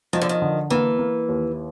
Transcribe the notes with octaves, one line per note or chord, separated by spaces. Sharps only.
D#3 F3
D3
D#3
D3
E3 A#3
A#3
D#2